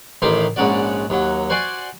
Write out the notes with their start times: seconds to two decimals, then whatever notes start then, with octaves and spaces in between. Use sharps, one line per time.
0.22 A1 D#3 A3 E4 C5 D6
0.56 A#1 G#2 C#4 F#4 D5
1.10 D#2 F#3
1.50 F#4 C5 D5 G#5 C6